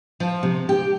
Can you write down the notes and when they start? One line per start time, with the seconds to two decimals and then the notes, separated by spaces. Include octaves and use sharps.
0.20 F3
0.43 C3
0.69 G4